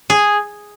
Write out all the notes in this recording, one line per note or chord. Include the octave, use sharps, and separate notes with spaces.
G#4